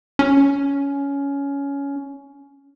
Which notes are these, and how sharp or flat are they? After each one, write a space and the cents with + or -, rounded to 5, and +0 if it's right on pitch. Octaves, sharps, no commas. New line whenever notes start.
C#4 +15